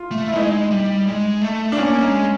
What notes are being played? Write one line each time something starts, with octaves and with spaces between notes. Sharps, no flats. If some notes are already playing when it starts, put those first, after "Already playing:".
Already playing: F4
A3
E4
G3
G#3 D#4
G3
G#3
A3
D4
A#3 C#4
G#3